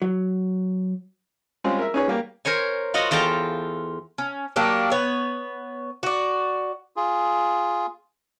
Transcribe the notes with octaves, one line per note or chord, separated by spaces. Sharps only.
F#3
G3 G#3 C4 C#4 F4 G#4
A#4 E5
C#4 D#4 G#4 B4 C#5
G3 A#3 G4
A#4 C5 C#5 G#5
F4 F#4 D#5 F#5
E2 F4 A4 G5 A5 A#5
C#4
F#3 A#3 D4 G4
B3 C#5
F#4 D5
F4 G#4